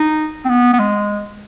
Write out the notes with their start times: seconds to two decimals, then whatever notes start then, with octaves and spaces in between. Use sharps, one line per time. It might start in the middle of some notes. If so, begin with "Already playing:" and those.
Already playing: D#4
0.45 C4
0.49 B3
0.73 B3
0.79 G#3